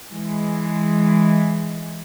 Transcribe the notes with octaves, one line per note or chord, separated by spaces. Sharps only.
E3 G#3